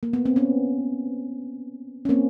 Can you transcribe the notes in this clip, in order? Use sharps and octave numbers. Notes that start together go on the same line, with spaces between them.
A#3
B3
C4
B3 C#4
C#4
A#3 C4